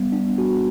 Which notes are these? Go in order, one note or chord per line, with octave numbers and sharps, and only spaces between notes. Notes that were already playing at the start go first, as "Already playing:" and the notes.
Already playing: G3 B3
D4
F#4